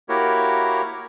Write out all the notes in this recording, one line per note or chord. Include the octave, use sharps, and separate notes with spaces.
A#3 E4 F#4 G4 A#4 C#5